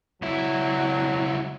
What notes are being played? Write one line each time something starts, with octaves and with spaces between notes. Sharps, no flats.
C#2 F#3 E4